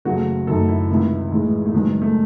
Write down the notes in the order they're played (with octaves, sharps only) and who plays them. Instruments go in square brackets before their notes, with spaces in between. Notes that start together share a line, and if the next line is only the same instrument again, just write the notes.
[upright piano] F#1 E2 C#3 F#3 A3 [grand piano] F#4
[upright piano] F#2 D#3 A3 [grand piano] A4
[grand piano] E4
[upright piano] C#2 C3 D#3
A1 G#2 E3 G#3
[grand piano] A3
[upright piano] F#1 E2 D#3 F#3 [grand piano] G#3
[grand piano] G#3
A3